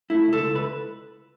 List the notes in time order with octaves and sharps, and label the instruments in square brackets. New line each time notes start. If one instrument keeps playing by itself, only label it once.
[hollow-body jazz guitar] A3 E4
C#2 A4
C#2
B4